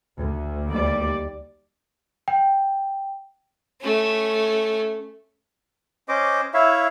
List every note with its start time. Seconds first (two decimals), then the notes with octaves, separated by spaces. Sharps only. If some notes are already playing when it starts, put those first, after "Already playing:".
0.17 D2
0.69 D#2 G3 D5
2.28 G5
3.81 A3 C#4
6.09 C#4 C5 D#5 D6
6.54 E4 C#5 E5 F5